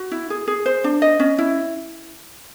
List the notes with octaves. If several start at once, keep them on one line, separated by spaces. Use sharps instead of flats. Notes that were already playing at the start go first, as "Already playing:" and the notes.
Already playing: F#4
E4
G#4
G#4
C5
D4
D#5
C#4
E4